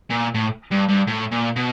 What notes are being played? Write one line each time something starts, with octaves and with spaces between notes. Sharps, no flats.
A#2
A2
G2
G2
A2
A#2
B2